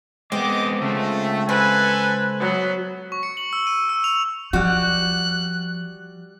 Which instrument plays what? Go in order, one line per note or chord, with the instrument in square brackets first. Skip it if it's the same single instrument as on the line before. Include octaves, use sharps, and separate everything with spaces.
[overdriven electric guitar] G#3 B3 [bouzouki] C4 [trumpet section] D#5 D6
[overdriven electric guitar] C#3 G#3 [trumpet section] A3
[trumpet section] A4 G#5 [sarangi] B4 [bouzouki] C5
[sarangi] F#3 [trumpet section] B3 B5
[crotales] C#6
C#7
F#7
E6
D#7
E6
F7
[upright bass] F3 [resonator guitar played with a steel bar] G3 F#4 [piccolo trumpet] F#6